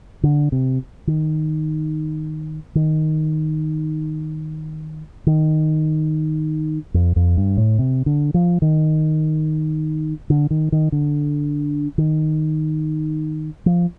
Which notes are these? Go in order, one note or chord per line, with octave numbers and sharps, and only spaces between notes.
D3
C3
D#3
D#3
D#3
F2
F2
G2
A2
C3
D3
F3
D#3
D3
D#3
D#3
D3
D#3
F3